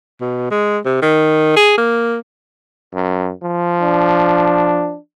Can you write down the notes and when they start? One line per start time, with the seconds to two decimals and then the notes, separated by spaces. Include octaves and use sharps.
0.20 B2
0.51 G#3
0.85 C3
1.02 D#3
1.56 G#4
1.77 A#3
2.93 F#2
3.42 F3
3.81 D4